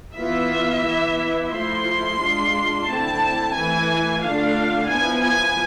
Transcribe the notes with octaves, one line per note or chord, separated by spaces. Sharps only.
E3 B3 F4 E5
E3 B3 E4
F3 A3 E4 C6
G#3 D4 F4
D3 A3 C4 E4 A5
E3 A3 E4 G#5
D3 A3 D4 F4 F5
F3 B3 E4 G#5
G#5